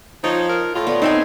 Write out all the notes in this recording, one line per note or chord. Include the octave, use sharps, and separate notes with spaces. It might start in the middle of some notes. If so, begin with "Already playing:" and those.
F3 D#4 F4 C#5
A#4
A2 F4 A4
B3 D5
C4 D#4 E5 G#5